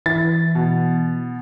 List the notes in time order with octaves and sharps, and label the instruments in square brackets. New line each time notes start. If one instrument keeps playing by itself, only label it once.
[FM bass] E3 [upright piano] A6
[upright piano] B2